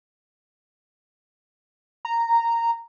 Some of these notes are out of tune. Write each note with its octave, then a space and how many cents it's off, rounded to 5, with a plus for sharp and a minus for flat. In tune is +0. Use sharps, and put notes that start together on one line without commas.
A#5 -10